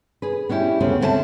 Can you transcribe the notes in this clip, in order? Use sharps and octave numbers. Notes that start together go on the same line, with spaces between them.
G#4 B4
B3 C#4 D4 E4 G4
D2 C#3 B3 C#4 C5
D3 B3 C4 A#4 E5 A5